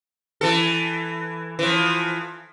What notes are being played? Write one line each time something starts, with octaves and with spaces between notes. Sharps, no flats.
E3 A4
E3 F3